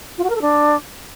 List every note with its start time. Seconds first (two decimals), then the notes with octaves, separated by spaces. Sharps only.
0.18 F4
0.24 F#4
0.30 A#4
0.36 A4
0.42 D4